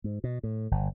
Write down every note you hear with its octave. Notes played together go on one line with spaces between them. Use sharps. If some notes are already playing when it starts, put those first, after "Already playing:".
G#2
B2
A2
G1